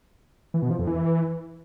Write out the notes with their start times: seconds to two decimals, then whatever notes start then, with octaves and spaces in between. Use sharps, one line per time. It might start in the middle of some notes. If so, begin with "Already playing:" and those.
0.54 E3
0.62 B2
0.71 F3
0.79 F2
0.87 E3